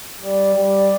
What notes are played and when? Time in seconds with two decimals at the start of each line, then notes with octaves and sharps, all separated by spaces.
0.21 G3 D5
0.54 G3
0.69 D5